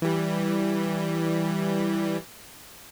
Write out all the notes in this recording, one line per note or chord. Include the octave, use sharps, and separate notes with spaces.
E3 G3